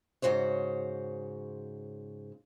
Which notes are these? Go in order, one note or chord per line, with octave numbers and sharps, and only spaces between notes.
G#2 C#3 F#4 C5 C#5